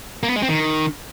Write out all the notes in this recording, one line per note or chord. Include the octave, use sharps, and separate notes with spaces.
A#3
B3
G#3
C4
D#3